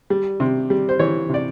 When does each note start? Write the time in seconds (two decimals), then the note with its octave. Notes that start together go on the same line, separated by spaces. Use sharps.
0.10 G3
0.40 C3
0.70 G3
0.89 C5
0.99 E3 C#5
1.29 C3 D5